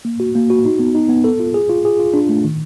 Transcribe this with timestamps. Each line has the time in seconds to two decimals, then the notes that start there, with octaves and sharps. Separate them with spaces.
0.05 A#3
0.20 F#4
0.35 A#3
0.50 F#4
0.65 D#4
0.79 B3
0.95 D#4
1.09 B3
1.24 A4
1.40 F4
1.54 G#4
1.69 F4
1.85 G#4
2.00 F4
2.14 D4
2.29 A3
2.44 D#3